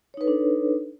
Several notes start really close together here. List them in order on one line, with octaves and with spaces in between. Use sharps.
C#5 D#4 B4 A4 D4